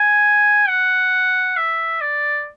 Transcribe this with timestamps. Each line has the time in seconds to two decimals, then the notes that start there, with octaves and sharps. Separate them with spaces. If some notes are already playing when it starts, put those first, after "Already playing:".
Already playing: G#5
0.68 F#5
1.57 E5
2.01 D5